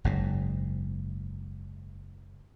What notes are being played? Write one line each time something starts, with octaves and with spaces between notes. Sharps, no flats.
F#1 G#2